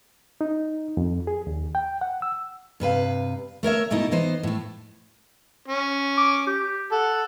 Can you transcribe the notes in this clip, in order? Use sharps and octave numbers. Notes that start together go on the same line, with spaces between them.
D#4
F2
G#4
D#2
G5
F#5
E6
G2 C3 B4 F5
A3 A#4 C#5 E5
G#2 B2 A3 D#4 E4
E3 B3 D#4 C5
A2 A3
C#4
D6
G4
A4 F#5